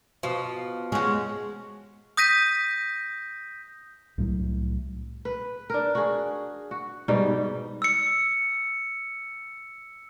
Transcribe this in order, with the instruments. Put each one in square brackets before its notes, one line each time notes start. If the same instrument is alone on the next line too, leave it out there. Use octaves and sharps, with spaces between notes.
[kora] B2 [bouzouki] F3
[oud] G#3 F#4 [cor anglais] C#4 [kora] G#4
[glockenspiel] D#6 G6 A#6 B6 D#7
[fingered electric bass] C2 A2 F#3
[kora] B4
D4 A#4
F#4 G#4
F#4
G#2 B2 G3 D#4
[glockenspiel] E6 C#7